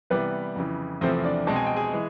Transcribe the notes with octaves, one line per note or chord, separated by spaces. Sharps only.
C3 E3 G3 B3 B4
F2 C#3 E3
E2 C3 F3 A3 C4 C5
D4 D5
B2 G#3 C4 A5
G#5
G5
G#4 G#5
E3 G#3